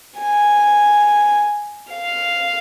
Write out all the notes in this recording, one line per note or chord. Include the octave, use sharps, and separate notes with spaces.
G#5
F5